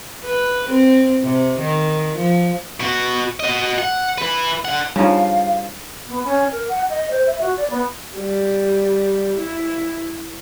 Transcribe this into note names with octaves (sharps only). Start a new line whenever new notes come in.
B4
C4
C3
D#3
F3
B2 F#4
F#4 D#5
F#5
E4 B4
D3 F#5
C#3 F3 G3 D4 D#4 F5
B3
C#4
A#4
F#5
D#5
C5
E5
F#4
D5
B3
G3
E4